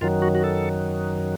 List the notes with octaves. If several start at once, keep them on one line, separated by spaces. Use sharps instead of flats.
F#2 D#3 F#3 F4
F#4
F#4
A4